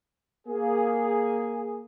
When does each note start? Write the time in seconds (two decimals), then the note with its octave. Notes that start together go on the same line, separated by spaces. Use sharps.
0.48 A#3 G#4